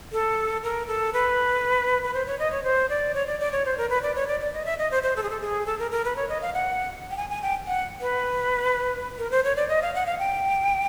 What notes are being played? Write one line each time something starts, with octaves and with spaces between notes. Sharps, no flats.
A4
A#4
A4
B4
B4
C5
C#5
D#5
C#5
C5
D5
C#5
D5
D5
C#5
C5
A#4
B4
D5
C#5
D5
D5
D#5
E5
D#5
C5
C5
A4
G#4
A4
G#4
A4
A#4
A#4
B4
C#5
D#5
F5
F#5
G5
G#5
G#5
G5
F#5
B4
A#4
C5
C#5
D5
D#5
F5
F#5
F5
G5